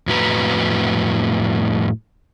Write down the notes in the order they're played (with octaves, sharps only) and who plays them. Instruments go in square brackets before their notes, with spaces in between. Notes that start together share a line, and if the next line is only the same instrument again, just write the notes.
[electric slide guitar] F2 A2 F#4 B4 A#5